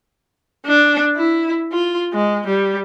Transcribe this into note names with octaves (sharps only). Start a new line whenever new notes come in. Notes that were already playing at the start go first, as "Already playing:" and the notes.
D4
E4
F4
G#3
G3